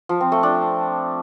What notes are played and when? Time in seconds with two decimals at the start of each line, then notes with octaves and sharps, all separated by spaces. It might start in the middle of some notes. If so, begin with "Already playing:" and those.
0.09 F3
0.21 C4
0.32 A3
0.43 D4